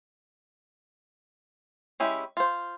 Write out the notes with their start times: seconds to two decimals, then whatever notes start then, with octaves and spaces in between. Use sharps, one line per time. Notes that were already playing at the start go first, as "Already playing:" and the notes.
2.00 G#3 C#4 E4 G4
2.37 F4 C5